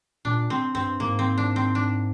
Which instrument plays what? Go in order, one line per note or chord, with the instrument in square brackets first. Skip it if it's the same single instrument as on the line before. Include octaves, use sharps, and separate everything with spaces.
[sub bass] A#2 [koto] D4
[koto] C4
[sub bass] G2 [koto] C4
[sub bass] G#2 [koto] A#3
[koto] C4
D4
C4
D4